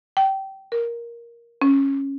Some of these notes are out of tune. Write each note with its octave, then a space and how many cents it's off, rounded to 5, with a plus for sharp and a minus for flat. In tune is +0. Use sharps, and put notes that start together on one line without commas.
G5 -20
A#4 +10
C#4 -10